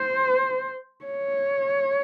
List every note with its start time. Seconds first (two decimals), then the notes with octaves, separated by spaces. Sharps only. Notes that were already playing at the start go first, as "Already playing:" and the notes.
Already playing: C5
1.06 C#5